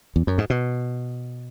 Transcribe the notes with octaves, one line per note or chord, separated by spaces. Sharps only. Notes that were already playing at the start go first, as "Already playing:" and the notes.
E2
F#2
G#2
B2